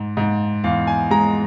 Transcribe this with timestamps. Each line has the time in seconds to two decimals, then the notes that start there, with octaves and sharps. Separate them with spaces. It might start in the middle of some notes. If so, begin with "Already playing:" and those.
Already playing: G#2
0.17 G#2
0.64 E2 F5
0.87 G#5
1.11 G#3 A#5